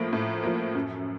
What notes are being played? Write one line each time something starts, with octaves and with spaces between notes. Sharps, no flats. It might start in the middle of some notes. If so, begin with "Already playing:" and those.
Already playing: A2 F3 A#3
A2
F3 A#3
F#2